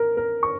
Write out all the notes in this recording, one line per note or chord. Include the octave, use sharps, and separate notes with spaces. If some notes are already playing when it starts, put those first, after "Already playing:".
Already playing: A#4
A#4
C#6